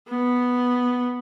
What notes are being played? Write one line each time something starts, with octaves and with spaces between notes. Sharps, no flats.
B3